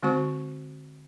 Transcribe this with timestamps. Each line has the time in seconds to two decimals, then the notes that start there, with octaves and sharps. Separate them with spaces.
0.03 D3 G#3 C4 F#4 C5 C#6